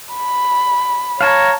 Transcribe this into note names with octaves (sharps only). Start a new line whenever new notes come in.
B5
C#5 F5 A5 A#5